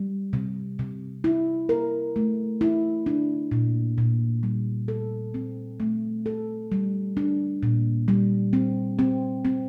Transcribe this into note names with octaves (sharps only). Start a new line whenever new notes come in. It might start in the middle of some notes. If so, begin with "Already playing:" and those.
Already playing: G3
C3
C3
E4
A#4
A3
E4
D4
A#2
A#2
G3
A4
C4
A3
A4
G3
D4
A#2
G3
C4
C4
C4